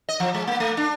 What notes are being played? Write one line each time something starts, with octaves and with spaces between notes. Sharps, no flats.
D#5
F3
G#3
A#3
A3
D4